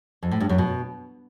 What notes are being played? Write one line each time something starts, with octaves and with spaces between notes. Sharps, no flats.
F2
A2
G2
F#2
B2